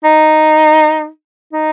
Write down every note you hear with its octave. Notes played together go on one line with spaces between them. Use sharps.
D#4
D#4